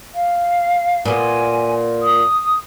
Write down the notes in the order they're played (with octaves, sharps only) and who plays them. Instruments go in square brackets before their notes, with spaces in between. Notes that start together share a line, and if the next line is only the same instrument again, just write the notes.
[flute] F5
[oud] A#2 B3 [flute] G#5
[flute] D#6